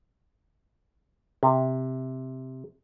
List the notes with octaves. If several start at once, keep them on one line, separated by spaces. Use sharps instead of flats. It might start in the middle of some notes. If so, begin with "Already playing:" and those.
C3